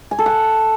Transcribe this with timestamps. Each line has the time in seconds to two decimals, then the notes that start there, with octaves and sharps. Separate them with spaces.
0.11 G#5
0.19 A4
0.26 F#5